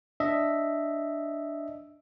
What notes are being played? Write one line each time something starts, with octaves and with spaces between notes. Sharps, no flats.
D4 D#5 E5